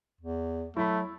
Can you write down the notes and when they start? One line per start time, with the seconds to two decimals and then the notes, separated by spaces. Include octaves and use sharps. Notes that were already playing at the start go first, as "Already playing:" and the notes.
0.21 E2
0.76 F#3 A3 E4 B5